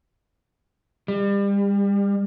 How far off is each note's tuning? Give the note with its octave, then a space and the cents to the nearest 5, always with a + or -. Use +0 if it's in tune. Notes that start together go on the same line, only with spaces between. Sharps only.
G3 +35